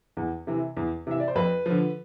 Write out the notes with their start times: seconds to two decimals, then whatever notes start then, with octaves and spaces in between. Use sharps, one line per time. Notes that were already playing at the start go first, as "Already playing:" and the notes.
0.17 E2
0.47 C3 E3
0.77 E2
1.07 C3 E3 E5
1.20 D5
1.28 C5
1.35 F2 B4
1.66 D3 F3